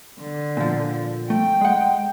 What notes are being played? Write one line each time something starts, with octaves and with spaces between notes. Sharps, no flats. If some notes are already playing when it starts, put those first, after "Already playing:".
D3
A#2 F3
A3 G5
G#3 F#5